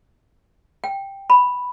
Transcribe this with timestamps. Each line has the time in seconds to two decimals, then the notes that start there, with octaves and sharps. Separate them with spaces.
0.84 G5
1.30 B5